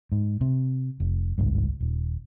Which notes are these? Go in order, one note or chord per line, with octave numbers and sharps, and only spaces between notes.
G#2
C3
F1
G#1 C#2 G2
D#1